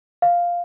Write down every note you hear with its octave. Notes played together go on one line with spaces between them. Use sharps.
F5